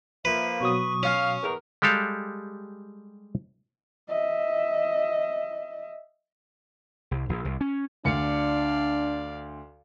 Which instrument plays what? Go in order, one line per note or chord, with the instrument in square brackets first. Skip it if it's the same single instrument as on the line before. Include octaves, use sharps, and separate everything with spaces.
[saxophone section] F3 A#3 [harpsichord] B4 [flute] E5
[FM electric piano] B2 F#3 D#6 [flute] C#6
[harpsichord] C#4 [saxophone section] F5
[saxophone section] E2 A#4
[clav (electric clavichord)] G3 G#3 G4 A4 F5
[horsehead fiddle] D#5 E5
[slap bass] C2
A#1
C2
C#4
[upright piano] D2 C#7 [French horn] D4 [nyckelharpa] D5 F5